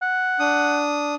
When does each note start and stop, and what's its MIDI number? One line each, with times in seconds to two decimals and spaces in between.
0.02 0.83 78
0.39 1.15 62
0.39 1.15 87